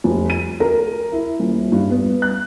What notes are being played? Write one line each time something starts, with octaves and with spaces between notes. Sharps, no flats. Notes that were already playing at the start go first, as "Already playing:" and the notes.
F1
D#7
A#4
E4
D#1
G2
B3
F#6